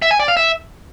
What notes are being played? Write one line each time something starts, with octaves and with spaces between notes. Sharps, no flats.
E5
G#5
D5
F5
E5